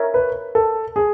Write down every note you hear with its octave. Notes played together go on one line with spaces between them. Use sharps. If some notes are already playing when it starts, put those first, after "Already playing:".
Already playing: A#4 C#5 E5
B4
A4
G#4